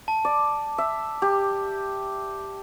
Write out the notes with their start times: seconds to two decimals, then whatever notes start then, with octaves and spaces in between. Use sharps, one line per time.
0.08 A5
0.25 D5
0.78 E5
1.22 G4